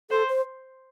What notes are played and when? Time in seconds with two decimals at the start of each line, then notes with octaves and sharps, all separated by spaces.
0.10 A4 C5
0.28 C5